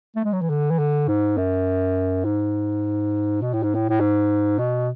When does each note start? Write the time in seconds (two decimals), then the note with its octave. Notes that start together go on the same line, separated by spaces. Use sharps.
0.16 A3
0.24 G#3
0.33 F#3
0.42 E3
0.50 D3
0.71 E3
0.79 D3
1.08 G#2
1.37 F#2
2.25 G#2
3.42 B2
3.53 A2
3.63 G#2
3.75 A2
3.89 A2
4.00 G#2
4.58 B2